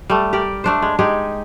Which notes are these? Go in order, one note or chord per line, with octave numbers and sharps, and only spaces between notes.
G3 A3
G4 A#4 D5
A3 D4 C5
G#3
G#3 D#4 G4 G#4